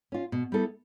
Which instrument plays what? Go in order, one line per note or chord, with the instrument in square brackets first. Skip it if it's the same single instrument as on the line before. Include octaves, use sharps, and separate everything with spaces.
[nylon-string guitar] C#4 F4
B2
G3 B3 E4 A4